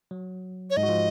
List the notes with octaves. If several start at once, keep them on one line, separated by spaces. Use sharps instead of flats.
F#3
C#5
G#2 G#3 D#5
F#4
F3 F4